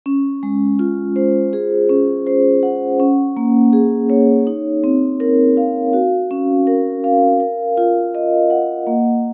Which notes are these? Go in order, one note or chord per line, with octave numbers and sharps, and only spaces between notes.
C#4
G#3
F4
C5
G#4
C#4
C5
F#5
C#4
A#3
G#4
C#5
D#4
C4
A#4
F5
F#4
C#4
A#4
F5
A#4
F4
D#5
F#5
A#3